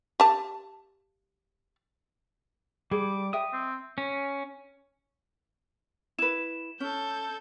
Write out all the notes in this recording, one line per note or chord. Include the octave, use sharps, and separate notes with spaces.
G4 A5
G3 G#4 D6
D#5 E5 G5 D#6
C4
C#4
E4 B4 E7
C#4 A4 G6